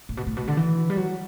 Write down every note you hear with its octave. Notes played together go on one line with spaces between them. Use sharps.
A2
B2
A2
B2
D3
E3
G3
F#3